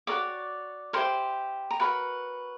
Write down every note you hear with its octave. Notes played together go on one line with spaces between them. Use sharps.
F#4 A#4 C#5 D5 D6
E4 G4 A#4 C5 C6
A#5
F#4 A#4 B4 C#5 B5